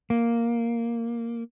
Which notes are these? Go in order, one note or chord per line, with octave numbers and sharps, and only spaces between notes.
A#3